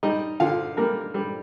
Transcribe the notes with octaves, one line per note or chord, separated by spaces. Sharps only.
G3 D#4 D#5
D3 F4 F5
G3 A#3 A#4
G3